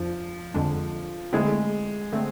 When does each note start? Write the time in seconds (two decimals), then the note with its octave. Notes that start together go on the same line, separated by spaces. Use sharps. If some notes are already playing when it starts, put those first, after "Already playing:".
Already playing: F2 F3 D4
0.54 F2 D3 G#3 D4
1.33 D3 G#3 A3 C4 E4 G#4
2.12 D3 A3 C4